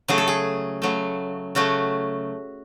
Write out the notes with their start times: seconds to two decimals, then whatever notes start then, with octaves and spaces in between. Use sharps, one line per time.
0.08 C#3 F#3 A3 G#4
0.18 A4
0.28 G#4
0.82 C#3 F#3 A3
1.55 C#3 F#3 A3 F#4